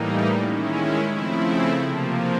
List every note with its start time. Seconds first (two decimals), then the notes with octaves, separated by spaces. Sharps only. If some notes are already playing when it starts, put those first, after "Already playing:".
Already playing: A2 E3 G3 A#3 D#4
0.42 D#3 G#3 C#4 E4
1.13 C#3 F3 A3 C4 E4
1.84 C3 F3 A#3